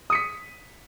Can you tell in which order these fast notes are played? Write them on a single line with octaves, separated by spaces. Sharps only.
D#6 C#7 B6